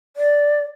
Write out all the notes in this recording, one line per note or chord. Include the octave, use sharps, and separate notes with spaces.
D5